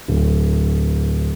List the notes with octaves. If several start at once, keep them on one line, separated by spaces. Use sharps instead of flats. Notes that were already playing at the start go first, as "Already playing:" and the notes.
D1